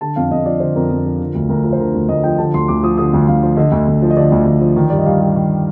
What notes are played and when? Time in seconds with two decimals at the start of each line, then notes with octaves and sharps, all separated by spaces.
0.01 D3 A5
0.16 F2 F5
0.31 F2 D#5
0.46 F3 D5
0.60 D3 C5
0.75 F2 A#4
0.90 F2
1.05 F3
1.20 D3
1.35 D2
1.49 D2 A#4
1.64 F3
1.73 C5
1.79 D3 A#4
1.94 D2
2.09 D2 D#5
2.23 F3 G5
2.38 D3 A5
2.54 D2 C6
2.68 D2 D6
2.83 F3 D#6
2.98 D3 D#6
3.13 D2
3.28 D2 F5
3.43 F3
3.57 D3 D#5
3.72 D2
3.88 D2
4.02 F3
4.10 D#5
4.16 D3 D5
4.32 D2
4.46 D2
4.61 F3
4.76 D#3
4.90 G2 D5
4.99 D#5
5.06 G2 F5
5.20 G3
5.36 D#3